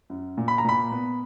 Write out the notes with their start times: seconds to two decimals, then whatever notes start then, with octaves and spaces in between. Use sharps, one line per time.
0.10 F#2
0.37 A#2
0.48 B5
0.58 A#5
0.65 A#2 B5
0.92 B3